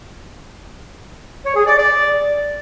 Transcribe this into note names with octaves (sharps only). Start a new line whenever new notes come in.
C#5
G#4
D5
D5